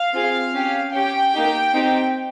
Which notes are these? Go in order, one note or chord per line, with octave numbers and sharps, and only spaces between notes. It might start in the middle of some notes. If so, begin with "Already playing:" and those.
Already playing: F5
C4 F4 G#4
C#4 G4
C#4 G4 G5
A#3 D#4 G4
C4 D#4 G4